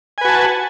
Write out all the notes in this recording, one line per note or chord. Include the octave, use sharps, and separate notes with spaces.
F#4 B4 G#5 A5